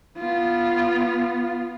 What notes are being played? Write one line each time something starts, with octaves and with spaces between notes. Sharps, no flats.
B3 F4